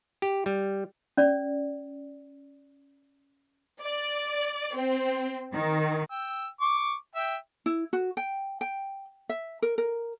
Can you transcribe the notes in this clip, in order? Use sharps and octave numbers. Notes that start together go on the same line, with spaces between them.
G4
G3
C#4 D5
D5
C4
D#3
G5 E6
C#6 D6
E5 G5
E4
F#4
G5
G5
E5
A#4
A#4